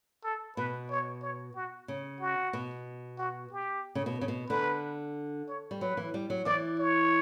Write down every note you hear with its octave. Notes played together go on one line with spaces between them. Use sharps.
A4
B2 B4
C#5
C#5
F#4
C#3
F#4
B2
F#4
G4
C#3
B2
C#3
B2
D3 B4
C#5
G3
F#3 B4
E3
G3
F#3
E3 D5
C#5